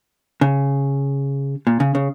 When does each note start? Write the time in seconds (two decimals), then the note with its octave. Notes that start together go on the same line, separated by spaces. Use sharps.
0.41 C#3
1.67 A#2
1.80 C#3
1.95 C#3